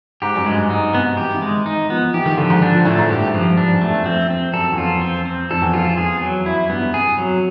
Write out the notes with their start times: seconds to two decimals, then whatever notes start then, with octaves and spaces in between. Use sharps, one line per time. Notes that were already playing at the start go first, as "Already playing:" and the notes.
0.22 G#2 G4
0.36 F#2
0.46 G2 G#3
0.69 G#2 D#4
0.93 C3 B3
1.17 E3 G4
1.34 E3
1.42 G#3
1.50 D#3
1.66 D#4
1.90 F3 B3
2.14 E3 G4
2.26 D#3
2.38 D3 F3
2.50 G#2
2.62 G#2 D4
2.75 A#2
2.85 A2 A3
2.99 G#2
3.10 G2 G4
3.27 G#2
3.34 G2 F3
3.57 G2 D4
3.73 E2
3.82 A3
3.90 F2
4.06 F2 C4
4.31 C4
4.54 F#2 A4
4.72 E2
4.78 F2 F4
5.02 C4
5.26 C4
5.51 F2 A4
5.62 E2
5.73 F2 F4
5.86 E2
5.97 E2 G#4
6.22 F#3
6.46 F#2 E4
6.70 G2 B3
6.94 C3 G#4
7.18 F#3